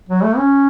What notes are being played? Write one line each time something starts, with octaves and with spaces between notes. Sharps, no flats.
F#3
A3
C#4